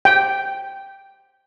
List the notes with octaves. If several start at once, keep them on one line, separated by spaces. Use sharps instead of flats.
G5